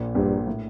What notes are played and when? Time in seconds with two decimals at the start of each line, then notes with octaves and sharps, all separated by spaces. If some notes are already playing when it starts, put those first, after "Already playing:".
Already playing: A#1 A#2
0.15 A#1 G2 A#2
0.47 A2